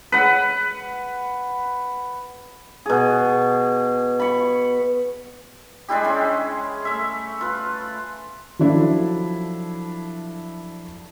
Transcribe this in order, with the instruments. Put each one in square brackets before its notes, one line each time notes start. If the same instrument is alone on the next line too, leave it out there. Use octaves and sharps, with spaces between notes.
[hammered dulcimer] B4 F#5
B2 G#4
B5 C#6
G#3 D4 E4 G4
G#3 C#4
A3 E5
F4 B4
[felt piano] F3 F#3 D4 E4 A4